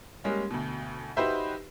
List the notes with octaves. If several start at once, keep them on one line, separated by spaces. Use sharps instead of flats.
G3 G#3 A#3 C#4
D2 B2
D#4 F#4 G4 B4 C5 E5